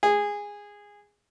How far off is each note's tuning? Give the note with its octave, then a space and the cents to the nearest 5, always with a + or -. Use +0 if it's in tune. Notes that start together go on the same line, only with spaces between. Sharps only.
G#4 -15